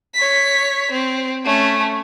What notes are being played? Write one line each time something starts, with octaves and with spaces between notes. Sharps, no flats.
C#5 B6
C4
A3 C#4